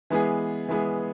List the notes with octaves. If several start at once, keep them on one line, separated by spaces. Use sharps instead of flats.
E3 G#3 B3 G#4
E3 G#3 B3 G#4